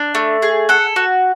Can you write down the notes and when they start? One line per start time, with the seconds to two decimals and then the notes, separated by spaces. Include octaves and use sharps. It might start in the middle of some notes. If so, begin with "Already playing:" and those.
Already playing: D4
0.15 A3
0.42 G#4
0.69 A4 F#5
0.96 F#4